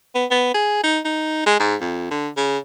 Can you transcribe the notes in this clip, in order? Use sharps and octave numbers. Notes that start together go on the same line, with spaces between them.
B3
B3
G#4
D#4
D#4
G#3
G#2
F2
D3
C#3